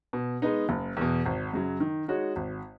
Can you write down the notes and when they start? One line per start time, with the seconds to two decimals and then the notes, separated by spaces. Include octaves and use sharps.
0.13 B2
0.42 G#3 B3 D#4
0.69 F#1
0.97 E2 B2
1.26 G#1
1.53 F#2 C#3 F#3
1.80 D#3
2.08 G#3 D#4 F#4 C#5
2.36 G#1